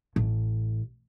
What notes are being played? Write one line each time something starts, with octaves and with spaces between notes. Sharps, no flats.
A1